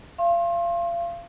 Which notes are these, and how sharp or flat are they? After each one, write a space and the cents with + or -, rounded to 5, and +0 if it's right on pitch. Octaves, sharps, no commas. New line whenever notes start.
F5 -30 C6 +35